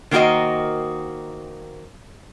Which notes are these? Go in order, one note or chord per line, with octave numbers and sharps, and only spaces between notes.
D#3 A#3 C4 F#4 A#4 D#5